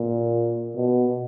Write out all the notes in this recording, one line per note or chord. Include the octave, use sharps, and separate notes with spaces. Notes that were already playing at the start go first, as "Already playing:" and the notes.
Already playing: A#2
B2